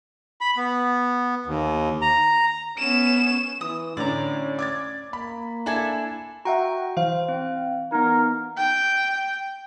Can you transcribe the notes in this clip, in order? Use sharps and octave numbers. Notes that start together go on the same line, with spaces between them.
B5
B3
D#2
A#5
B3 C#4 E7
E3 D#6
A2 D3 C#4 D5 A#5
D6 G#6 A6
A#3 B5
D4 E4 A4 G#5
F#4 E5 F#5 G5 A#5
E3 C5 F5
C4
B3 D#4 A#4
G5